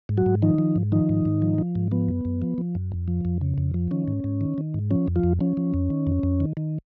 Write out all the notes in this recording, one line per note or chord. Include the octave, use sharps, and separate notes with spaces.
G#2
F#3 F#4
G#2
D#3 F3 D#4
F3
G#2
D#3 F3 D#4
G#2
G#2
F3
F3
G#2
F3 B3
F#2
F#2
F3
F3
F#2
F2
F3
F2
C#3
F2
F3
D#3 C#4
G#2
G#2
D#3
D#3
G#2
F3 C#4
F2
F3 F4
F2
F3 C#4
F3
F2
D#3
F2
F2
D#3
D#3